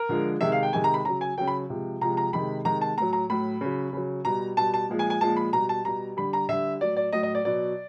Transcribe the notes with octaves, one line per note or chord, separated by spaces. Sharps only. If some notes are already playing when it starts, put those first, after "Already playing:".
Already playing: A#4
D3 F3 G#3
C3 D#3 G#3 E5
F5
G5
C3 D#3 G#3 G#5
A#5
B5
C#3 F#3 A#5
G#5
C#3 F#3 G5
B5
C3 F3 G#3
C3 F3 G#3 A#5
A#5
C3 D#3 G#3 B5
C3 D#3 G#3 A#5
A5
A2 F#3 A#5
A#5
A2 F#3 B5
C#3 F#3
C#3 F#3
B2 G3 A#5
B2 G3 A5
A5
A#2 F3 G#3
G#5
G#5
A#2 F3 G#3 A5
B5
B2 G3 A#5
A5
B2 G3 A#5
D3 G3 B5
A#5
D3 G3 E5
A2 F#3 D5
D5
A2 F#3 D#5
D#5
D5
B2 F#3 D5